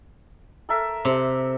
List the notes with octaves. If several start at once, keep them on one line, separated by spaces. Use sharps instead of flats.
A4 A#4 E5
C3